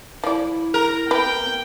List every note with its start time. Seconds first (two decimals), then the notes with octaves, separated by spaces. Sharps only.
0.24 F3 E4 D5
0.74 A#4
1.11 B4 G5